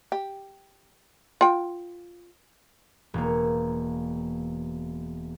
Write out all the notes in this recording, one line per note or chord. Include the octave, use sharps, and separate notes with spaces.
G4
F4 G5
E1 A#3